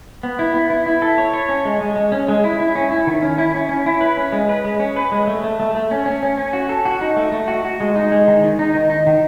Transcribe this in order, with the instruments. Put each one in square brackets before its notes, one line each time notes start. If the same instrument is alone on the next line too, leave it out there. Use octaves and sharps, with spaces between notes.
[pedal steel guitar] B3
E4
B3
E4
E4
A4
C#5
C#5
C#4
G#3
G#3
G#3
C#4
G#3
E4
E4
C#4
E4
D#3
C#4
E4
C#4
C#4
E4
B4
C#4
G#3
B4
G#3
C#4
B4
G#3
A3
A3
A3
A3
C#4
C#4
C#4
C#4
F#4
A4
F#4
D#4
A3
A3
F#4
F#4
G#3
D#4
G#3
D#3
D#3
D#4
D#3
D#4
D#3